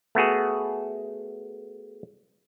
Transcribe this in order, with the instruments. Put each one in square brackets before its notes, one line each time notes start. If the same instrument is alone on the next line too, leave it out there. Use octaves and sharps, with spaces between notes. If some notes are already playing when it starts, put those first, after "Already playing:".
[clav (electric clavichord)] A3 B3 F#4 G#4